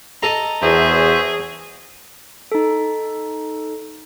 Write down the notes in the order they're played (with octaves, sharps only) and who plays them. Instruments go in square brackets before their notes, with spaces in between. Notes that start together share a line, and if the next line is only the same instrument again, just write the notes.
[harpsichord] A4 D#5 A#5
[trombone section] E2 [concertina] F#4 C5 E5 [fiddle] G#4
[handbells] D#4 A4